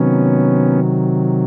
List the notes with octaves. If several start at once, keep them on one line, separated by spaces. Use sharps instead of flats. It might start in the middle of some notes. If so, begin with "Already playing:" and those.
Already playing: C3 D#3 F#3 B3 C#4